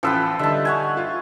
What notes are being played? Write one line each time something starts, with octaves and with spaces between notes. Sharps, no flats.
A1 F3 B4 G5 E6
D3 G3 D#4 E5 A5
C#5 F#5 G#5
F4